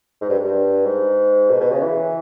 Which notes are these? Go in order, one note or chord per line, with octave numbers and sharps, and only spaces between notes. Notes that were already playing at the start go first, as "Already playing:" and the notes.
G#2
G2
G2
G#2
B2
B2
C#3
E3